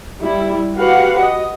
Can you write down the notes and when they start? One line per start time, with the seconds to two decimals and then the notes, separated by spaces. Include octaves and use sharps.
0.21 G3 E4
0.75 F#4 G4 B4 F5 F#5
1.23 D#5